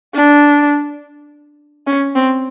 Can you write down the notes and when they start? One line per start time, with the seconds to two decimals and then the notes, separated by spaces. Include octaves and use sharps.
0.14 D4
1.87 C#4
2.15 C4